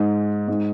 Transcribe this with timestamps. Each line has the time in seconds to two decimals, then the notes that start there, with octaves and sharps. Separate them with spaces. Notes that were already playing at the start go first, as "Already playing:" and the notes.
Already playing: G#2
0.48 G#2